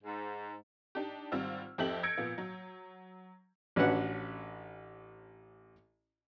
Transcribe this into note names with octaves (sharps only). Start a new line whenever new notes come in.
G#2
D4 D#4 G4
G#1 G3 C4 F4 E6 F6
F2 C4 G4 A4 E5 F#7
E6 G6 G#6 A#6 C#7 D7
A#2 F3 B3
F#3
A1 C#4 D4 F#4 B4 F#5